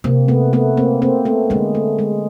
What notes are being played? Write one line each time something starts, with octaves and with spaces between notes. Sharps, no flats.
C3 A#3 C4
A3 B3
A3 B3
A#3 C4
A#3 C4
A3 B3
D3 G#3 A#3
A3
G#3